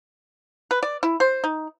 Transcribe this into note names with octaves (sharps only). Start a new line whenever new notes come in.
B4
D5
E4
C5
D#4